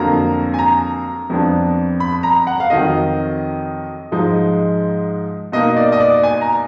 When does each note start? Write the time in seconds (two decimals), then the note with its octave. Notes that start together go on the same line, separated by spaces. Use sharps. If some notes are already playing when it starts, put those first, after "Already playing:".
Already playing: F2 D3 F#3 A#3 A#5
0.54 G#5
0.59 A#5
1.30 F2 F3 B3 D4
2.00 B5
2.23 A#5
2.47 F#5
2.60 F5
2.70 F2 D#3 F#3 D#5
4.12 G#2 F3 G#3 D#4
5.52 B2 A#3 D#4 D#5
5.77 D5
5.92 D#5
6.00 D5
6.23 G#5
6.41 A#5